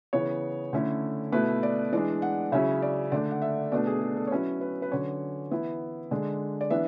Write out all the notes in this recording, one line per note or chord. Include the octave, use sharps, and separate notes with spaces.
C#3 E3 B3 C#5
D3 A3 C#4 E4
B2 A3 E4 B4
D5
E3 G#3 D4 D5
F#5
C#3 F#3 C#4 E4 E5
D5
D3 A3 D4 D5
F#5
E5
B2 A3 D4 D5
G#4
G#4
A4
C#5
F#3 C#4 E4 B4
B4
B4
D3 F#3 C#4 C#5
E3 B3 E4
D3 G#3 D4
D5
E3 B3 D4 E5